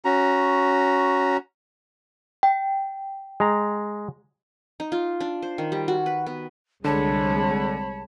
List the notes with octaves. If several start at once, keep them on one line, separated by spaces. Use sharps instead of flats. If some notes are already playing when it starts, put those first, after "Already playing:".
C#4 F#4 A#5
G5
G#3 A#5
D#4
F4
D4
C5
D#3
G3
F#4
B4
B3
C2 D3 G#3 C#5 A5 B5